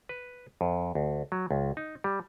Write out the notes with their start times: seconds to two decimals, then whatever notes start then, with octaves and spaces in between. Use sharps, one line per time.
0.09 B4
0.61 F2
0.95 D2
1.32 F#3
1.51 C#2
1.77 D#4
2.04 G3